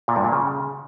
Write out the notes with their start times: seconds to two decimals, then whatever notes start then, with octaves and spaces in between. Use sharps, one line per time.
0.08 A#2
0.16 G2
0.24 A#2
0.32 C#3